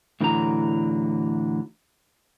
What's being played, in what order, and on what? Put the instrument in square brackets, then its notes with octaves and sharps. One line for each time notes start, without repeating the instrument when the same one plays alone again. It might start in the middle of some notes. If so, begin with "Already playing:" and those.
[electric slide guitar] A2 D3 E3 F#3 G#4 A#5